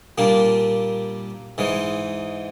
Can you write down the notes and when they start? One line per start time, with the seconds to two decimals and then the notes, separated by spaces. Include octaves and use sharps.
0.18 A#2 G3 A#3 D4
1.58 G#2 E3 G#3